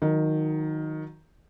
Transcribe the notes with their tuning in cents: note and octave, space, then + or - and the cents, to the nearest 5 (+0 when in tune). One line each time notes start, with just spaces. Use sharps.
D#3 +0 F#3 -25